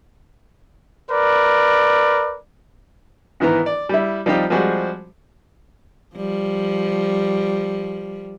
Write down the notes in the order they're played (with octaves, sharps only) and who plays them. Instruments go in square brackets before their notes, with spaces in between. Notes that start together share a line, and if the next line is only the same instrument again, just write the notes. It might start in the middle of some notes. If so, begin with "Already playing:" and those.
[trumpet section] A#4 B4 D5
[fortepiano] G#2 D#3 E3 B3 A#5
D5
G3 E4
F3 G3 C4 D#4 F4 G4
F3 G3 G#3 C4 F#4 G#4
[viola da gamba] F3 G3